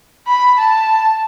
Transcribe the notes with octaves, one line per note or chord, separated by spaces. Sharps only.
B5
A5